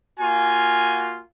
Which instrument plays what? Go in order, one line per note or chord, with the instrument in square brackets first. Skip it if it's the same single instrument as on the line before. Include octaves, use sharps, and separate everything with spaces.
[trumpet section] A#3 F4 F#4 G#5